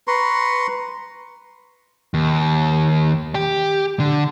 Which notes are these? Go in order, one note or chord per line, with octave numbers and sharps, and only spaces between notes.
B4 A#5 C6 C#6
D#2
G4
D3